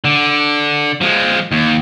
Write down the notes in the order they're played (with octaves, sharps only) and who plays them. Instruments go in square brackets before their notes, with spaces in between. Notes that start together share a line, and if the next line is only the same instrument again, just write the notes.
[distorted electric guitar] D3
F3 G#3
D#2